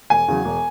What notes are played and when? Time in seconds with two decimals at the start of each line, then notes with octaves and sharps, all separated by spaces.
0.10 E1 G#5
0.28 E2 C#3 F#3
0.45 E1